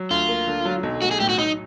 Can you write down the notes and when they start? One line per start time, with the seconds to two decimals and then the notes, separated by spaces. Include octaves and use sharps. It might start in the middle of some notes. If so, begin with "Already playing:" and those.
Already playing: F#3
0.11 D2 F4
0.29 A#3
0.47 D3
0.65 F#3
0.83 B1
1.02 A3 F#4
1.11 G#4
1.20 A2 G4
1.29 F#4
1.38 F#3 D#4